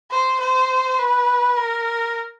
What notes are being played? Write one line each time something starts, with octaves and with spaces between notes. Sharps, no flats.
C5
C5
B4
A#4